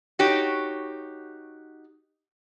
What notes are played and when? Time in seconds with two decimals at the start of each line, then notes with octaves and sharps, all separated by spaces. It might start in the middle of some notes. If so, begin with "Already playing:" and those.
0.19 D#4 F#4 G4 C#5